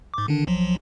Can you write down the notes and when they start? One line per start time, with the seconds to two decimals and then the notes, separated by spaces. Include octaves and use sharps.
0.14 G#2 D6
0.28 D3 D#3 D4
0.47 B1 F3 F#3